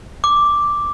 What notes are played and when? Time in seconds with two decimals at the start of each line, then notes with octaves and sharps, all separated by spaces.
0.24 D6